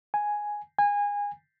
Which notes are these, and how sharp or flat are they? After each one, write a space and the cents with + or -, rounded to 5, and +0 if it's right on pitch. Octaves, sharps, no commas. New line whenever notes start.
G#5 +0
G#5 -25